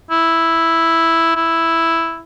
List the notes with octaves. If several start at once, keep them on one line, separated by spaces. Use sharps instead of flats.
E4
E4